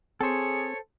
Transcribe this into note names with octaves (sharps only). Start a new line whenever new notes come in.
C4 G#4 A4 C5 C#5